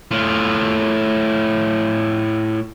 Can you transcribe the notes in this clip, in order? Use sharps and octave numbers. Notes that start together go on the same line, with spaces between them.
A2 F4